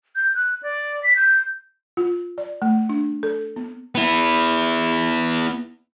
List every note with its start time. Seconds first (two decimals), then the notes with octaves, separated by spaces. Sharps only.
0.16 G6
0.35 F#6
0.63 D5
1.03 B6
1.16 G6
1.97 F4
2.38 D5
2.62 A3
2.89 D4
3.23 A4
3.56 B3
3.95 B3 E4